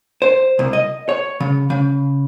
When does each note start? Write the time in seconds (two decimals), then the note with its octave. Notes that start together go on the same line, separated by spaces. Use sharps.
0.22 C5
0.59 C2
0.73 D#5
1.09 C#5
1.40 C#3
1.70 C#3